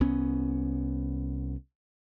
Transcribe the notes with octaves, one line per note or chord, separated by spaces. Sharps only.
C2 B3 C#4